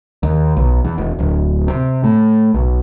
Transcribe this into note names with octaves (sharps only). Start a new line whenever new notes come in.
D#2
B1
E2
E1
D1
C3
A2
B1